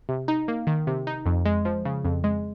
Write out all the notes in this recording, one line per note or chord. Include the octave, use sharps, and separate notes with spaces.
C3
D#4
A#3
D#3
C3
D#4
F2
G#3
F3
C#3
F2
G#3